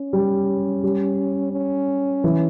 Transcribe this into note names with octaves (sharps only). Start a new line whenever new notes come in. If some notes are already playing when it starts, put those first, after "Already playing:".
Already playing: C#4
G3
G3
C#4
E3